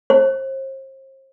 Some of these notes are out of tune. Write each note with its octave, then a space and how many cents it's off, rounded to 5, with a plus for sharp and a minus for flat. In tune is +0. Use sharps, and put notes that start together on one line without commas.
C5 +35